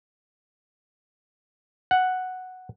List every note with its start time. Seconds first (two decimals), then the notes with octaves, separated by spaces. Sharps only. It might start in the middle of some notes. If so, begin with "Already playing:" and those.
1.91 F#5